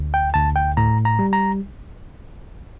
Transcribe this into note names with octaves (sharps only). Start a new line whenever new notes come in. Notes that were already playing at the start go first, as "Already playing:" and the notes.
Already playing: D2
G5
D2 A5
G5
A2 A#5
A#5
G3
A#5